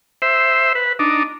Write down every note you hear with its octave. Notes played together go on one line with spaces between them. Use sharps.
C5 E5
B4
D4 D#4